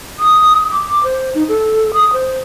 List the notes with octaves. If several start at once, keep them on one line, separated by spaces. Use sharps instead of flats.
D#6
D6
C5
D#4
A4
D#6
C5